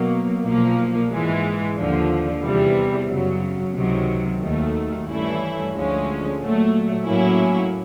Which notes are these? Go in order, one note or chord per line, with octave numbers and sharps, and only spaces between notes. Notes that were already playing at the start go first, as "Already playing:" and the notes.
Already playing: B2 F#3 A#3
B1 A#2 F3 A#3
G#2 E3 G#3
D#2 D3 F3
E2 C3 E3 G3
F#2 C#3 F#3
C#2 C3 D#3 F#3
D#2 D#3 F#3 A3
G2 E3 A3 C#4 E4
D2 D3 F3 G#3 C#4
A#2 F#3 A3
A2 F#3 A#3 C#4 E4